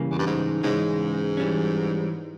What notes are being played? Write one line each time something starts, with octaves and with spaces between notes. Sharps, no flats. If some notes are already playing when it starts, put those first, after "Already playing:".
Already playing: C#3 E3 G3 A#3
E2
G2
G#2
G#2 C#3 E3 G#3 C#4
E3 G3 C#4